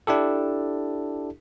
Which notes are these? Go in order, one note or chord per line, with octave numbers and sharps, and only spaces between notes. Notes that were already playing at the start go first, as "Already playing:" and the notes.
D4 E4 G4 A4